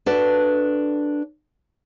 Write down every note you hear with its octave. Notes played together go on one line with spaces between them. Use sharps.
D4 F#4 A4 B4 D5